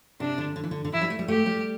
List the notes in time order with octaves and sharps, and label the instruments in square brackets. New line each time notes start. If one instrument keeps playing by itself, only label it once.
[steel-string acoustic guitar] C3 [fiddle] D4
[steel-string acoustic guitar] D3
D3
E3
D3
D3
[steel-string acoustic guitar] E3 [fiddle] E4
[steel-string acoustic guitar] G3
A3
G3
[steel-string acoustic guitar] A3 [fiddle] G4
[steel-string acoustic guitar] G3